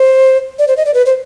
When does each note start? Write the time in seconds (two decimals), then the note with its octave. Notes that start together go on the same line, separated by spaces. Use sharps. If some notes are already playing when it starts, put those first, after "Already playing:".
Already playing: C5
0.59 D5
0.68 C5
0.77 D#5
0.86 D5
0.94 B4
1.06 C5